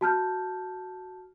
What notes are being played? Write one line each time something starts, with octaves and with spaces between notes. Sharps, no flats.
F#4 A5 F6 G6